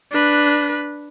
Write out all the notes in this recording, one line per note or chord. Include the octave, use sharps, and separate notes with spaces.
D4 B4